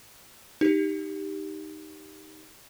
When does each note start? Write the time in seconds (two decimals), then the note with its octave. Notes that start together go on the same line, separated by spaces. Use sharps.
0.61 D#4 G4